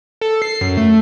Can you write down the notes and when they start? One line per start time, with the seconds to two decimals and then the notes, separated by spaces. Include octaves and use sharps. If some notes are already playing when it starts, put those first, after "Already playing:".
0.21 A4
0.42 C7
0.61 F#2
0.77 A3